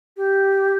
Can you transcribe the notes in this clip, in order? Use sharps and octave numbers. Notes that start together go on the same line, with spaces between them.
G4